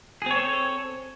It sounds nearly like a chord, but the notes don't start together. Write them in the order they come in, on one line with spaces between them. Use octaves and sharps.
G#4 C4 C#5 A4